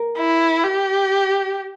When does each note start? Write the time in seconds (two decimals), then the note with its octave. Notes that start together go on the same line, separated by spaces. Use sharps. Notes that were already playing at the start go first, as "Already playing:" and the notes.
Already playing: A#4
0.18 E4
0.64 G4